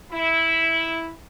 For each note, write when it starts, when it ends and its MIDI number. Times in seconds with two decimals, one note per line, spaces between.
0.12 1.11 64